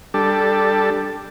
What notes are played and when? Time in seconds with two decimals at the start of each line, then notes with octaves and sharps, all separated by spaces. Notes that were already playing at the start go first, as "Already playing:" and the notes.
0.14 G3 D4 A4